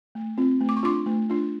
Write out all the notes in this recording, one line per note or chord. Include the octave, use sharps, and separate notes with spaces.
A3
C4 F4
A3
D6
C#6
D4 F4 C6 D6
A3
D4 F4